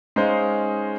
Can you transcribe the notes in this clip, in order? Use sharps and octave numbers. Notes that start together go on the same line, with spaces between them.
G#3 C#4 D#4 G#4 C5 F5